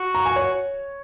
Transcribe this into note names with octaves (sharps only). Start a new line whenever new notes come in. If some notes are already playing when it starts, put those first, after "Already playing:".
Already playing: F#4
A#5
G#5
C#5